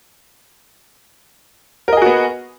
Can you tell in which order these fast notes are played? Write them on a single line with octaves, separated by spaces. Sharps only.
A#4 D#5 G#4 F#4 B3